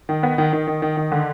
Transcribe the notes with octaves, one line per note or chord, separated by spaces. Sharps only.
D#3
B3
D#3
D#3
D#3
D#3
D#3
D3